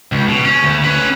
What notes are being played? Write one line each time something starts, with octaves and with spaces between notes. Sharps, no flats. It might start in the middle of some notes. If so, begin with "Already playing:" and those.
C#2
B2
C#4
D2
C#4 B4